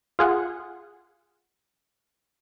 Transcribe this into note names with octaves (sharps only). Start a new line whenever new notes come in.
F4 G#4 F#5